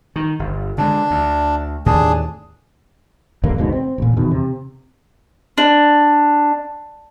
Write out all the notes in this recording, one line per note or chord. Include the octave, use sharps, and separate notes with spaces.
D#3
G1
D3 E3 G#3 D4
D2
D#2 A2 D4 G#4
E2 G2 D3 A#3
F#1 D2 G#2 B2
C4
A1 A#2
E2 B2 D#3
C3
D4